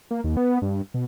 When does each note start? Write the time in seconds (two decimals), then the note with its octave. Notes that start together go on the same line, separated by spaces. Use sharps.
0.11 A#3
0.24 D#2
0.37 B3
0.62 G2
0.94 B2